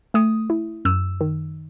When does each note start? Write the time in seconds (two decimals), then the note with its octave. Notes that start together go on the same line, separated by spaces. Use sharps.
0.14 A3 D#6
0.50 E4
0.85 F#2 E6
1.21 D#3